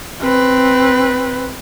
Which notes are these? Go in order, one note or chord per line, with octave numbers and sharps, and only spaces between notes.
C4 B4